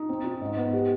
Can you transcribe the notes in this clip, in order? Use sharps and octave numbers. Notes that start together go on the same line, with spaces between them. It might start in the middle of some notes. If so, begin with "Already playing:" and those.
Already playing: D#4
C4
D#4
G#2
B3
G4